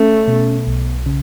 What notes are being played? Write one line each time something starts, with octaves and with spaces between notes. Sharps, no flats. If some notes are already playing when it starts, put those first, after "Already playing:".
Already playing: A3 C#4
B2
B1
C#3